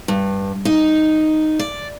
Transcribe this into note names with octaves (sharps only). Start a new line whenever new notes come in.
G2
D#4
D5